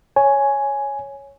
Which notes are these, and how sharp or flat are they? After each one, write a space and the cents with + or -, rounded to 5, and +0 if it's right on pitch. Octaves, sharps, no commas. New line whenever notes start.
C#5 +0 G#5 +5